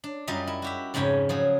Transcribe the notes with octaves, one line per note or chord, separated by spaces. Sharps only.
D4
F#2 G3 F4 A#4 D#5
E4
F#4 G4 E5
F2 G#2 C#3 G5 G#5 B5
F3 F#3 G#4